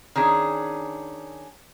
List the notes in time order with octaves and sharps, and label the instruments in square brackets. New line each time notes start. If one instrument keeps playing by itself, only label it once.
[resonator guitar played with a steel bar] D#3 C#4 D4 G#4